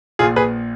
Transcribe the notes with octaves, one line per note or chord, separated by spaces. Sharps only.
A#1 A#2 F4 G#4
G#4 B4